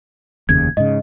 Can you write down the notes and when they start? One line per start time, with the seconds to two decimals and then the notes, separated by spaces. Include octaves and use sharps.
0.49 F1 D#2 C#3 G#6
0.77 G#2 C#3 D#5